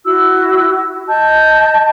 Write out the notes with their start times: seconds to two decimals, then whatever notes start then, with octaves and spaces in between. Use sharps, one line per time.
0.05 E4 F#4 E6
1.08 D#5 A5 G6